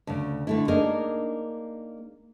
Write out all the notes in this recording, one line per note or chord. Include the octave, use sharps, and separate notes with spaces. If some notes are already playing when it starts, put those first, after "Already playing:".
D2 C#3
D3 A3 E4
A#3 D4 D#4 G#4 A#4